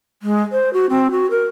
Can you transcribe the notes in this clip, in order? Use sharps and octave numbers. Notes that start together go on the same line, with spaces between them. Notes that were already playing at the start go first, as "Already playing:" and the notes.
G#3
C5
F#4
C4
F#4
A#4